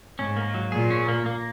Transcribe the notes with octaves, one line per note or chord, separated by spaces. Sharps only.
G#2 C#4
A#3
F#3
A#2 G#4
C#4
A#3
A#3